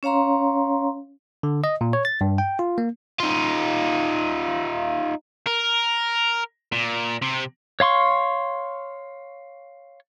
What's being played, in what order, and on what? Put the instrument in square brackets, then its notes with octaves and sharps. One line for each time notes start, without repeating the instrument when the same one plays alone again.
[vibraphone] C#4 C#5 F5 A#5 C6
[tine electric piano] D3
D#5
A#2
C#5
A6
G2
G5
F4
A#3
[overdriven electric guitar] D#4 F4
A#4
A#2
C3
[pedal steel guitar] C#5 F5 C6 C#6